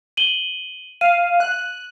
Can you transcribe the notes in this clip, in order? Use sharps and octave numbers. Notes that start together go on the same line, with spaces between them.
D#7 F#7 G7
F5 D#7
F#6